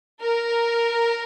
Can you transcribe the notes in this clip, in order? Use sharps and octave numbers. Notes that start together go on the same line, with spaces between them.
A#4